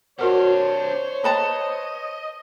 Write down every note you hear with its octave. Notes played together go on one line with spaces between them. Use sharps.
C3 D4 F#4 A#4 C5 C#5 F#5
B4 D#5 A5 A#5